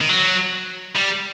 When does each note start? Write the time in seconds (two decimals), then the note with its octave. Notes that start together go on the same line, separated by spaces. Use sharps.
0.01 D#3
0.09 F#3
0.96 G3